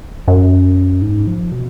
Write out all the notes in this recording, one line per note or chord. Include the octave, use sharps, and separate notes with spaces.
F#2
G#2
F3
B2